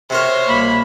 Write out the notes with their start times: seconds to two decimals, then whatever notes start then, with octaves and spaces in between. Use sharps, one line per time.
0.10 C3 F#4 A#4 C5 C#5
0.48 C2 B2 A#3 B5